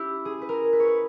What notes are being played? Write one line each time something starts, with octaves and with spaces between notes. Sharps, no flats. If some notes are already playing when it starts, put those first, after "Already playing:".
Already playing: C#4 E4 G4
G#4
B4
A#4
B4
C#5
B4